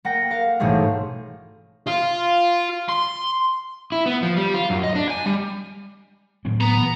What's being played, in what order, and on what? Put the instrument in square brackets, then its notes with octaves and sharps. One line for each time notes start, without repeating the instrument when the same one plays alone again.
[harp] A#3 F#5 G5 A#6
A#4 F5
A1 G#2 B2 G3 A3 G#4
[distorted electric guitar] F4
C6
[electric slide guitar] E4
B3
F3
G3
F4
F#2
D#5
D4
G#5
G3
[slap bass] A2 F#3 C4
[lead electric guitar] B3 [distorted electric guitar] A#5
[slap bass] A#2 E3